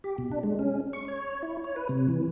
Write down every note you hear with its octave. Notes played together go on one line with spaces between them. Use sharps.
G4
B2
D4
G#3
C#4
C#6
C#5
E4
C#5
B4
C3
E3